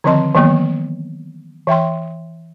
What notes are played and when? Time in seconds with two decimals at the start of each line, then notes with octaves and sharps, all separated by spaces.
0.04 D3 D#3 F3 C4 D#5 C6
0.35 D#3 E3 F#3 A#3 B3
1.67 E3 E5 G5 C6